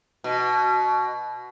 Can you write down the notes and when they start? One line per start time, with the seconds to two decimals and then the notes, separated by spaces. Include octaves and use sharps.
0.24 B2